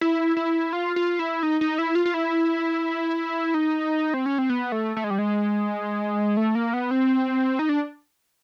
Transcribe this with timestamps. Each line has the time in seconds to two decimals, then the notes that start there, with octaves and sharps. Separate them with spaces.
0.01 E4
0.37 E4
0.73 F4
0.96 F4
1.19 E4
1.43 D#4
1.61 D#4
1.78 E4
1.95 F4
2.06 F4
2.14 E4
3.54 D#4
4.14 C4
4.26 C#4
4.38 C4
4.50 B3
4.72 A3
4.97 A3
5.04 G#3
5.10 G3
5.18 G#3
6.37 A3
6.55 A#3
6.73 B3
6.91 C4
7.59 D#4
7.69 D4